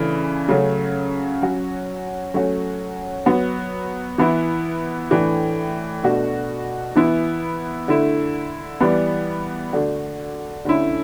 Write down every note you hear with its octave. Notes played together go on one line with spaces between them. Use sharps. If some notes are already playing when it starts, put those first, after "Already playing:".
Already playing: C#3 E3 A3 D4
C#3 F#3 A3
F#3 C#4 F#4
F#3 A3 C#4 F#4
F#3 B3 F#4
E3 B3 E4
A2 E3 A3 D4
B2 A3 D4 F#4
E3 B3 E4
D3 A3 E4
E3 G3 B3
D3 A3 D4 F#4
D3 A3 C#4 E4